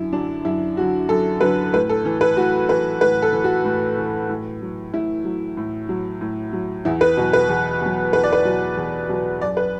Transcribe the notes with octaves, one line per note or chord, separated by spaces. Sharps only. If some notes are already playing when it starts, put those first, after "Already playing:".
Already playing: F#2 D3 E4
D3 F#3 D4
F#2 E4
D3 F#3 F#4
F#2 A4
D3 F#3 B4
A2 B4
A4
E3
B4
A2 F#4
E3 B4
A2 B4
A4
E3
F#4
A2
E3
A2
F#3
A2 E4
F#3
A2
F#3
A2
F#3
E2 E4
B4
B2 F#3
B4
E2
B2 F#3
E2 B4
D5
B4
B2 F#3
E2
B2 F#3
F#2 D5
B4